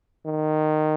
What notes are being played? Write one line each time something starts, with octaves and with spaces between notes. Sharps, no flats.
D#3